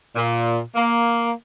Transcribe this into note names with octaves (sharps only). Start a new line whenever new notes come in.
A#2
A#3